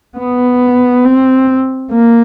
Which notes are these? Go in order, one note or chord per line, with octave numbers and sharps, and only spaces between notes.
B3
C4
A#3